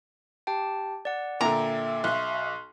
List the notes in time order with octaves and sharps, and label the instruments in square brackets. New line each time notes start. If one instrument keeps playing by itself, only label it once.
[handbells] G4 G5 A5
D5 F#5
[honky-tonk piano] A#2 D3 [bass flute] E5 [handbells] G5 [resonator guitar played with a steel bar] A#5
[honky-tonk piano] B1 [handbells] C6 C#6 F#6